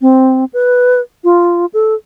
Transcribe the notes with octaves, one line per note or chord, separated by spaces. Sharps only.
C4
B4
F4
A4